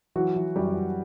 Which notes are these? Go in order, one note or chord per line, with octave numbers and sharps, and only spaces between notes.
E3 F#3 F#4
E3
F#2 G3 G4
F#2